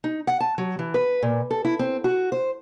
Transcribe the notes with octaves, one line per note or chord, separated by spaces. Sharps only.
D#4
F#5
A5
F#3
E3
B4
A#2
A4
E4
C4
F#4
C5